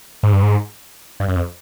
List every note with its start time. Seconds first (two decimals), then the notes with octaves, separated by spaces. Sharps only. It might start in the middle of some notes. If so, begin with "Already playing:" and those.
0.23 G#2
0.33 G2
0.43 G#2
1.20 G2
1.28 F#2
1.36 F2